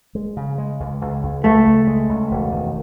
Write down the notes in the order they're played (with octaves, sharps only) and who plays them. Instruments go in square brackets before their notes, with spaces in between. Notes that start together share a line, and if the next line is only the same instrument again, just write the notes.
[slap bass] G#3
C#3
G#3
C#2
C#2
C#2
[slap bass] C#2 [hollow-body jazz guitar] A3
[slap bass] C#2
G#3
C#2
E1
D#3